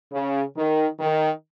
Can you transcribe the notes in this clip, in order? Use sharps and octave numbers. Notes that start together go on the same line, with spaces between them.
C#3
D#3
D#3